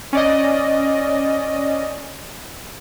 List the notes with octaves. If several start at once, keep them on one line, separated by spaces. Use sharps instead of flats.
C#4 D5 D#5